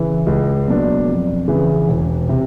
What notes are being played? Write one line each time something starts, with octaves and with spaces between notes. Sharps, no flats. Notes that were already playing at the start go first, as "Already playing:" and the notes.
Already playing: C#3 E3
C#2
B2 F#3 A#3 D4
F2
C#3 E3
E1
C3